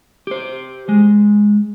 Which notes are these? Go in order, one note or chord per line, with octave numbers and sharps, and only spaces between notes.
G4 C5
G#3